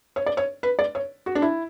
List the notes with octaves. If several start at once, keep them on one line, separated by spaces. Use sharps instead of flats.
C#5
D5
C#5
B4
D5
C#5
F#4
D4
E4